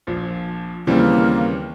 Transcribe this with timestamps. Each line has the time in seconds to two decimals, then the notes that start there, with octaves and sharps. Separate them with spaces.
0.07 A#1 A#2 F3
0.87 D#2 C#3 E3 G3 A#3 C4